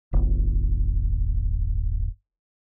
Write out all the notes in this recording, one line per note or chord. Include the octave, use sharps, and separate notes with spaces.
D1 G1